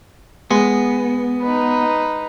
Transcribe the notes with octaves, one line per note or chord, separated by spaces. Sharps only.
G#3 B3
D#4 B4